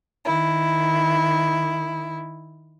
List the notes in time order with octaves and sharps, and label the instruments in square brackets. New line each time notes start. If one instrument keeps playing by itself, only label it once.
[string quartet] D#3 E4